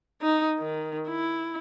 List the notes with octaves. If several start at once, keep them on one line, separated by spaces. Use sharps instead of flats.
D#4
D#3
E4